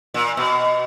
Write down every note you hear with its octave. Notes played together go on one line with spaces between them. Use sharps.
A#2
B2